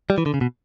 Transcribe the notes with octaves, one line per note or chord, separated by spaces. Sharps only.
G3
E3
D3
C#3
B2